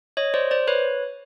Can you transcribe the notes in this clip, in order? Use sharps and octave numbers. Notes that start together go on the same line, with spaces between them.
C#5 D#5
C5 D5
C5 D5
B4 C#5